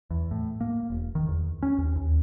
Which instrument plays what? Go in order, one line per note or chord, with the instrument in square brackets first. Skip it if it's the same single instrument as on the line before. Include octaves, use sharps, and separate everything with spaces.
[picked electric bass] E2
A2
A#3
E1
D#3
E2
C#4
D#2
D#2